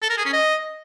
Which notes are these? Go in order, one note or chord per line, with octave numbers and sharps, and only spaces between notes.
A4
A#4
G#4
C#4
D#5